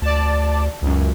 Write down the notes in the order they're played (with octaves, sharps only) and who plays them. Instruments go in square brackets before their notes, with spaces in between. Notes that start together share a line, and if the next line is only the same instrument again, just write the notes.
[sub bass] D2 [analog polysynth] D5 A5
[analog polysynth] C#2 F#2